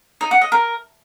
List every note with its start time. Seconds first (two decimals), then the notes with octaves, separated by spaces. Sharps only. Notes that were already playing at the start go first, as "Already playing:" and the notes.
0.21 D#4
0.31 F#5
0.41 D#5
0.52 A#4